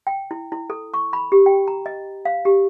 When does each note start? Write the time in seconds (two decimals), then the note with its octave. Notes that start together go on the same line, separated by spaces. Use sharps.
0.07 G5
0.31 E4
0.52 E4
0.70 A4
0.94 C#6
1.13 B5
1.32 G4
1.46 G5
1.68 A#5
1.86 D#5
2.25 F5
2.45 G4